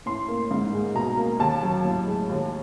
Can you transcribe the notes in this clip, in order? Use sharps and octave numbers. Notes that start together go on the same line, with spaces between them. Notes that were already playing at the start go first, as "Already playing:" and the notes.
A2 C6
A#3
G#2
G#3
B2 A#5
A#3
D#2 A5
F#3
A2
G#3
D#2